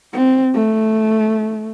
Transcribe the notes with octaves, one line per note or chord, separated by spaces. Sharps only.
C4
A3